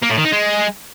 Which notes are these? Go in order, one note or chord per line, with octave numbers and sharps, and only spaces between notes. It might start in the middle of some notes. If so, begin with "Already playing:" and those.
A#3
A2
D#3
D#4
G#3